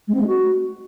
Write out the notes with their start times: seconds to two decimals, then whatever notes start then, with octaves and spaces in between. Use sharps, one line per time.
0.08 G#3
0.14 C4
0.20 G#3
0.27 F#4